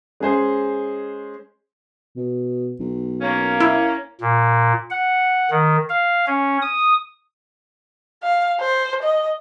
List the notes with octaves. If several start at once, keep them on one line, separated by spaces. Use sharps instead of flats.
G#3 C#4 G#4 C5
B2
B1
A#3 C#4
E4
A#2
F#5
D#3
F5
C#4
D#6
F5
C5
D#5